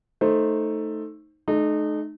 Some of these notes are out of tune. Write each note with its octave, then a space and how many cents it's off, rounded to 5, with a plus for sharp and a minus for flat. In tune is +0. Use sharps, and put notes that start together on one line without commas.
A3 +0 D#4 +0 C5 +10
A3 -45 D#4 -30